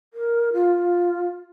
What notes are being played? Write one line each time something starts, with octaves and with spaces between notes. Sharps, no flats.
A#4
F4